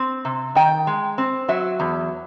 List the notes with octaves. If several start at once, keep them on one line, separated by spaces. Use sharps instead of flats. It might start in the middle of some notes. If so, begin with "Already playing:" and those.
Already playing: C4
C3
D#3 G5
G#3
C4
F#3 E5
E2